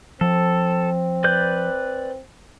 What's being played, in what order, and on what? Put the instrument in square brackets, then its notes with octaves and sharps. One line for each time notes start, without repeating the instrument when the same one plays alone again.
[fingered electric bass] F3 [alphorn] C4 [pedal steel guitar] A4
[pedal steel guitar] B4 D5 G6